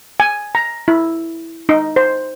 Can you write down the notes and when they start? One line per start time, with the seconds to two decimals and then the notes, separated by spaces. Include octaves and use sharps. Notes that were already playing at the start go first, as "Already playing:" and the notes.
0.20 G#5
0.55 A#5
0.88 E4
1.69 D#4
1.96 C5